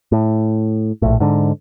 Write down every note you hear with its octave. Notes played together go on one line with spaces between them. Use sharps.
A2
A#1 A2
G#2 D3